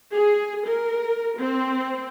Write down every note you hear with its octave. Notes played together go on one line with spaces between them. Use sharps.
G#4
A#4
C4